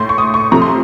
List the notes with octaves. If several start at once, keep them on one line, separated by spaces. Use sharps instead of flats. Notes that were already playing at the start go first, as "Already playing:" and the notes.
Already playing: A2 A3 C6
C#6
D#6
C#6
C3 F3 A3 A#5
C6